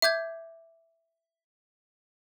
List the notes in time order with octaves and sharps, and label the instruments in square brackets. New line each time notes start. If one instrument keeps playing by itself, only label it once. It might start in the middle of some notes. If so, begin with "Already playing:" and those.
[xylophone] E5 D6 G6 G#6